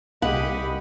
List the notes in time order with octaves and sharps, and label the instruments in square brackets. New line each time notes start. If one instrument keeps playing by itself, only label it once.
[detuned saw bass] C2 [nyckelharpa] G4 G#4 [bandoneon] D#5 B5 [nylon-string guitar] F#5